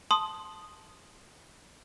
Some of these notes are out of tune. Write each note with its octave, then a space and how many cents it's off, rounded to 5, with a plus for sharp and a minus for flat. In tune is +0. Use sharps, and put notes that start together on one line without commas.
A5 -10 C6 +0 D#6 +0